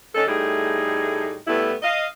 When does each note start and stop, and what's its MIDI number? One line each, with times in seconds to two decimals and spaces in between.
0.15 0.25 50
0.15 0.25 61
0.15 0.25 63
0.15 0.25 69
0.27 1.36 45
0.27 1.36 55
0.27 1.36 57
0.27 1.36 63
0.27 1.36 68
1.47 1.73 45
1.47 1.73 55
1.47 1.73 57
1.47 1.73 59
1.47 1.73 64
1.82 2.05 75
1.82 2.05 77